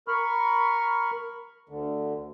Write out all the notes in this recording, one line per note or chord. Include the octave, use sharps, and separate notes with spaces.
A#4 B5 C#6 F6
D2 D3